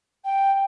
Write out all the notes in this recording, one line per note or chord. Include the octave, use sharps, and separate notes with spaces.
G5